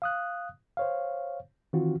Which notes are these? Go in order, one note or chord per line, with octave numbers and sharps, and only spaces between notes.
F5 D#6 F#6
C5 C#5 F5
D#3 E3 C4 F4 F#4